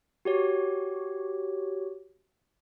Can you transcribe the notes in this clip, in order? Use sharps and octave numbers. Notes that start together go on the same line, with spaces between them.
F#4 G4 C#5